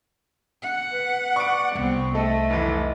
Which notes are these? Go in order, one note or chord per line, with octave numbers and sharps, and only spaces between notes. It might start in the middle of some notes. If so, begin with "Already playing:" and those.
F#5
B4
D5 C#6 D7
C2 B3 C4
A3 A4 D#5
F1 E3